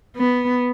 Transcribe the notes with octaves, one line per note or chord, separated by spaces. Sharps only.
B3